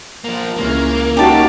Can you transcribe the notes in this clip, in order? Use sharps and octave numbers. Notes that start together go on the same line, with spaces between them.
F3 A#3
C#2 E3 A#3 C#4
C#2 C#4 D#4 F#4 G4 A5